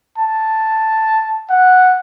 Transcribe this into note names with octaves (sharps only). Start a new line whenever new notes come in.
A5
F#5